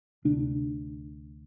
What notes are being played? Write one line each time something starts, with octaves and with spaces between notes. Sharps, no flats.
D2 C3 D4